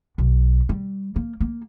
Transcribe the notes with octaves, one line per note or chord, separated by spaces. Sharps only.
B1
G3
A#3
A#3